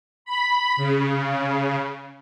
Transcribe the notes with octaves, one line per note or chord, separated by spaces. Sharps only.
B5
C#3